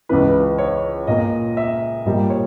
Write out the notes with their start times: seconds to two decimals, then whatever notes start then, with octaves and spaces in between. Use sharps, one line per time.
0.09 C#2 C#3 E3 B4
0.58 C#5
1.07 A#2 A#3 D#5
1.57 E5
2.06 A#2 G3 A#3 D#5
2.30 C#5